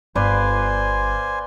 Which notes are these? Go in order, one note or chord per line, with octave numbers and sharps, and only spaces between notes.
G1 B4 C5 D5 F5 G#5